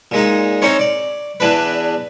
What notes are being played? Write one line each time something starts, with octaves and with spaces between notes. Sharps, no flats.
A#2 G#3 D#4
C4 C#4 D#4 C5 C#5
D5
E2 E3 D4 B4